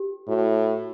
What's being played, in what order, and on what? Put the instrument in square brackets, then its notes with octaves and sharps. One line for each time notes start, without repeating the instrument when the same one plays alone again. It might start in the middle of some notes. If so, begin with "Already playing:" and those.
Already playing: [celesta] G4
[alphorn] A2 [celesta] F#4